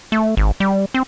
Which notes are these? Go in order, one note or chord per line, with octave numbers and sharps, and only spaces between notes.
A3
G#1
G3
C4